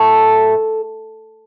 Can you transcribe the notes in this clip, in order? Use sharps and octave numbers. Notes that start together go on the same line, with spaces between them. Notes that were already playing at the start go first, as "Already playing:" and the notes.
Already playing: A2 F#3 A3 A4